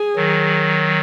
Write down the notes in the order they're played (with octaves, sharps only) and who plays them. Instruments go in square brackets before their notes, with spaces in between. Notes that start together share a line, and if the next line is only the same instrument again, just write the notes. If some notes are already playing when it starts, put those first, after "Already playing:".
Already playing: [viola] G#4
[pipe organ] D#3 F#3